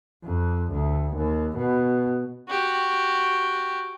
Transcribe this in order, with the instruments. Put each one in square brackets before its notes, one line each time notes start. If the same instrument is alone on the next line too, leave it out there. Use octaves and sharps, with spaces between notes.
[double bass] F2
D2
D#2
B2
[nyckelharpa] F#4 G4